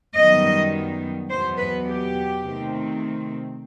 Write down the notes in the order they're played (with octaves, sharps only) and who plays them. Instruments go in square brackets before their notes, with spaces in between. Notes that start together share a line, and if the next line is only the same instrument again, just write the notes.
[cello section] F#2 D#3 G3 B3 D#5
E2 B2 F#3 B3 C5
B4
G4
C3 D#3 A3 C4